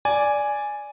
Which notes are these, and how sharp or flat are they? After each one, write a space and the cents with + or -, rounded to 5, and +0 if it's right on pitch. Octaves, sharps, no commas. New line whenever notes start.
D5 -5 G#5 +0